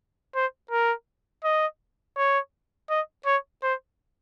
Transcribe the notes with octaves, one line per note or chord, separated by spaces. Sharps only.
C5
A#4
D#5
C#5
D#5
C#5
C5